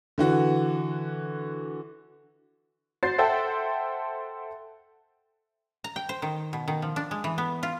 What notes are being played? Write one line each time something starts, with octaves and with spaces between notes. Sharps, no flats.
D3 E3 F#4
F#4 C5 A6 C7
A4 C5 E5 F#5 G5 A5
A#5
G5
C5
D#3
B2
D#3
F3
D4
G#3
E3
B3
F4